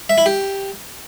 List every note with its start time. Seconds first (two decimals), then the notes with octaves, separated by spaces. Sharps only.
0.09 E5
0.18 E4
0.26 G4